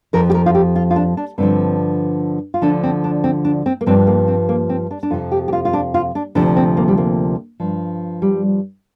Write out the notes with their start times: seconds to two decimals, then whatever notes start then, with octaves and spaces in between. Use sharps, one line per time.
0.13 F2 F3 A#4
0.30 G4
0.34 A#4
0.46 F4
0.55 G4
0.76 F4
0.91 F4
0.96 D4
1.17 D4
1.38 G2 D3 F3 C4
2.54 F4
2.62 D2 D3 F3 D4
2.83 C4
3.04 D4
3.24 C4
3.45 D4
3.66 C4
3.81 A#3
3.86 G2 F3 C4
4.07 A#3
4.28 C4
4.49 A#3
4.69 C4
4.91 D4
5.03 D4
5.10 F2 C3 F3 F4
5.32 G4
5.48 G4
5.53 F4
5.65 F4
5.73 D4
5.94 F4
6.15 D4
6.35 D2 C3 F3 D4
6.56 C4
6.77 A#3
6.88 G3
6.98 A#3
7.60 G2 F3
8.22 G3